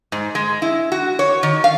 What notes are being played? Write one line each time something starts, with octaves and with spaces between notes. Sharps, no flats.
G#2
G#3
E4
F#4
C#5
D#3
F5